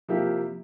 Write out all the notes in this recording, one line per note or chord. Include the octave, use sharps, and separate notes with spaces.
C3 F3 A#3 E4 G4